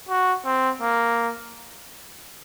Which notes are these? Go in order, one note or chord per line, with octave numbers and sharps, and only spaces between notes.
F#4
C4
A#3